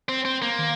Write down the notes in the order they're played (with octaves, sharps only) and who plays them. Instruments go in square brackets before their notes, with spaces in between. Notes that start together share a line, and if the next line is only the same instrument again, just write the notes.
[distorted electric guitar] C4
C4
A#3
[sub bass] D#3